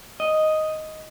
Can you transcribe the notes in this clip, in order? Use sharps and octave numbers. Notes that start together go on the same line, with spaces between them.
D#5